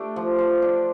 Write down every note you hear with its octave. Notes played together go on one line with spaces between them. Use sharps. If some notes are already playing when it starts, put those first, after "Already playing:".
Already playing: A3 D4 G4
F3
F3
D4